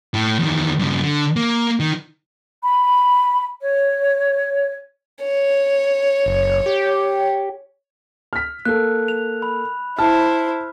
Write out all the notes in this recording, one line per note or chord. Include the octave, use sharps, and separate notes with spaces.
A2
E2 D#3
G2 C#3
D3
A#3
D#3
B5
C#5
C#5
F#1
G4
F6 B6
A#3 A4 F#6
F7
B5
E4 C5 A5 F6